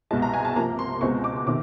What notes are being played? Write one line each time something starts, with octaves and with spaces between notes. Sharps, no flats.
C2 B2 G#3 A5
A#5
G#5
A5
C3 F3 A#3 A#5
C6
C#2 B2 G#3 C4 C#6
D6
C3 D#3 D6